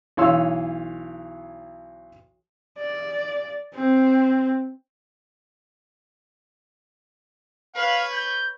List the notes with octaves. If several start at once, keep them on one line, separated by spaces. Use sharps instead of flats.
B1 E3 C#5 F5 C6 E6
D5
C4
B4 C#5 F5
G6